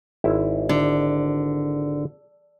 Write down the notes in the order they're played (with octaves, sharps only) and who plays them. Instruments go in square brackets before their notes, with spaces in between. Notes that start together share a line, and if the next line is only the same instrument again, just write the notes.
[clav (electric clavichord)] G#1 E4 C5
[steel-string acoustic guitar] D3